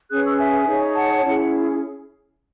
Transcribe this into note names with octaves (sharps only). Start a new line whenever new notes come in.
C#4 G#4 B4 D#6 F#6
C#6 E6
E5 G#5
D#4 G#4 C#5
F#5 A5
C#4 E4 G#4